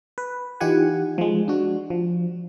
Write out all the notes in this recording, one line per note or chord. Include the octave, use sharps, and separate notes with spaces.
B4
E3 D#4 F4 G4 F#5 G#5
F3 G#3
D4 F#4
F3